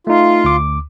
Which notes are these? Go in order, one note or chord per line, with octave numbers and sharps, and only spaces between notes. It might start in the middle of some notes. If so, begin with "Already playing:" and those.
A3 D#4 F4
D2 D6